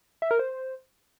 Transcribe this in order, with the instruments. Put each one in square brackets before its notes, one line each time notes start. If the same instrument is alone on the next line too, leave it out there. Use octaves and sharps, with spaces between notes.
[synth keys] E5
A#4
C5